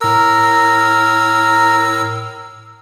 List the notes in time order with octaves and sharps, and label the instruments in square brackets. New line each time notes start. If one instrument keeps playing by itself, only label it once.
[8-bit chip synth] A2 E6 [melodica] A#4